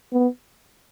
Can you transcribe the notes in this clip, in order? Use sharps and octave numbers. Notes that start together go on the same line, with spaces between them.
B3